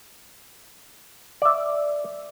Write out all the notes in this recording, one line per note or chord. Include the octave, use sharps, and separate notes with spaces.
D5 E5